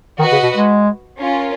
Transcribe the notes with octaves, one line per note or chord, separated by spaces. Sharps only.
D#3 F#4 B4 D#5 F#5
C#3
B2
G#3
C#4 F4 A#4